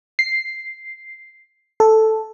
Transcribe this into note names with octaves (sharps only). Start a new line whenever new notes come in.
C7
A4